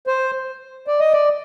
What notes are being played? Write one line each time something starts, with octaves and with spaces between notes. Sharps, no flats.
C5
D5
D#5
D5